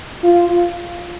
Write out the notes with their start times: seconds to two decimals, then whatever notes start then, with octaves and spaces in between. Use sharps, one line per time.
0.24 F4